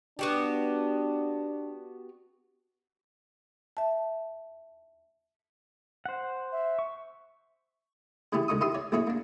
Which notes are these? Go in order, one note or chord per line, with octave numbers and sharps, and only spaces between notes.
B3 D4 F#4 G4
E5 A5
C5 F#5
E5
C#6
C#3 E3 A3 E4 G4 G#4
C#2 D3 D#4 C#6 D#6
D#3 E4 G4 A4 C6 D#6
C#5 D5
A#1 A2 E4 F#4 G#4 C#5
A#3 D4